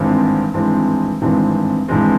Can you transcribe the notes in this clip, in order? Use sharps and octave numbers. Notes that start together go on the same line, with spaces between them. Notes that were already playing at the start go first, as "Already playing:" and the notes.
Already playing: G#1 G2 E3 G#3 C4
G#1 G2 E3 G#3 C4
G#1 G2 E3 G#3 C4
G#1 G2 E3 G#3 C4